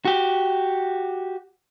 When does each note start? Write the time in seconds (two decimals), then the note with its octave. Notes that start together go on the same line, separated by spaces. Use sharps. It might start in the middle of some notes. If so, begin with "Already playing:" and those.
0.05 F#4 G4